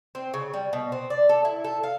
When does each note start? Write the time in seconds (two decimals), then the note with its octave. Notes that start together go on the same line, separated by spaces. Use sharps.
0.15 C4
0.34 C#3
0.54 G3
0.73 B2
0.92 C4
1.10 D5
1.29 A4
1.45 E4
1.64 A4
1.83 F5